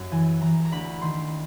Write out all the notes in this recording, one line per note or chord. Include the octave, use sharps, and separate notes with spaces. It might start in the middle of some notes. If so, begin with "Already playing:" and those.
Already playing: F#2
E3 G#5
E3 A#5
A#5
D2 B5
D#3 C6